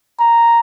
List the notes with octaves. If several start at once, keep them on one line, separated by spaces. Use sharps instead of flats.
A#5